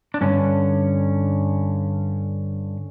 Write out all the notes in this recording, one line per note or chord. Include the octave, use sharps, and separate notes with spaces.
D4
G2 D3 C#4